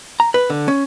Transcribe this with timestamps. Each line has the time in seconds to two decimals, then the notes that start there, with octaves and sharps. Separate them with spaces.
0.20 A#5
0.34 B4
0.50 D3
0.68 C#4